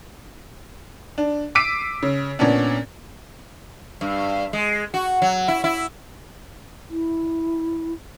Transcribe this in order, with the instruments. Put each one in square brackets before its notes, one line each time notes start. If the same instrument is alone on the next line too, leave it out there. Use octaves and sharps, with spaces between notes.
[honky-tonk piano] D4
D6 E6 B6 C7 D7 D#7
C#3
A#2 B3 C#4 D4
[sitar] G2
G#3
F#4
F#3
E4
E4
[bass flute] E4